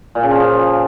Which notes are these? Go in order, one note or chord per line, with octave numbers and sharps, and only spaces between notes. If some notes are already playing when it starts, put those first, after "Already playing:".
A#2
C#3
F3